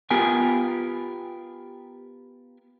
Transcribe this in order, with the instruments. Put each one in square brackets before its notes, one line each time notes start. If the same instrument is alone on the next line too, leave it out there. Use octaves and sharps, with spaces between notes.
[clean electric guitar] B3 F4 G4 A#4 G#5